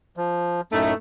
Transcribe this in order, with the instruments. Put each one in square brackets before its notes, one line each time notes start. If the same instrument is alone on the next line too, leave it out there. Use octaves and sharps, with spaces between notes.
[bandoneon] F3
[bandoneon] F#2 A2 D#4 [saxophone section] A3